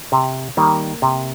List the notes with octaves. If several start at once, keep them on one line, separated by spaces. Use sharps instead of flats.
C3
D#3 G3 A#3
C3